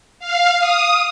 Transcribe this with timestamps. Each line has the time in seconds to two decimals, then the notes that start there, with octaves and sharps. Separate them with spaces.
0.19 F5
0.59 D#6